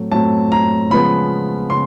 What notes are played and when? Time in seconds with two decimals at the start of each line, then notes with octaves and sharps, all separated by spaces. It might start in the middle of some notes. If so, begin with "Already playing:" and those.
Already playing: A2 F#3 A3 C4
0.12 A2 F#3 A3 C4 A5
0.52 A#5
0.90 C#3 F3 G#3 B3 B5
1.70 C#3 C6